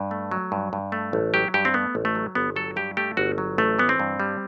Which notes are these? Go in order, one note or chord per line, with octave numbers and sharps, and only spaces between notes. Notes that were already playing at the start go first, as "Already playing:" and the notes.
Already playing: G2
A3
F#3
G2
G2
A3
A1
F#3 G4
G2 G4
C4
A3 B3
A1
A3
F#3
G1 B3
F#3 A4
G2 G4
A3 G4
G1 F#4
F#3
A1 A3
E3 B3
C4
G2
G3